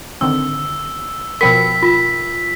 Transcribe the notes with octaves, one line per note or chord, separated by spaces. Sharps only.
D3 D#3 C4 E6
B2 F3 A#4 G5 B5 B6
F4